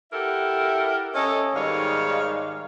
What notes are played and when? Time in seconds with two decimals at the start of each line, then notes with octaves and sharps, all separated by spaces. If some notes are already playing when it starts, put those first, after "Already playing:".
0.13 E4 G4 A4 A#4 E5 F#5
1.15 C#4 A4 D#5
1.55 G#2 D#3 G3 C#5 D#5 F5